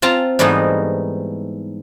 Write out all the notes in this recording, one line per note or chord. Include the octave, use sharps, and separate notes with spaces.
C4 F4 A5 A#5
G#2 E3 G3 A3 B3 D#4